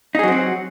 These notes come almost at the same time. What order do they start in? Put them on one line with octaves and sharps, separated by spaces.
D#4 G#4 F#3 C4 F#4